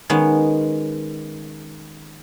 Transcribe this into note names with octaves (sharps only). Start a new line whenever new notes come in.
D#3 G#3 B3 C#4